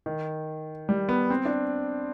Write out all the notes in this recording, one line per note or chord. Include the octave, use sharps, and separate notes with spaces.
D#3
G3
B3
C4
D4